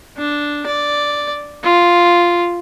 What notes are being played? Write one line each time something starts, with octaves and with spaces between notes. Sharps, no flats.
D4
D5
F4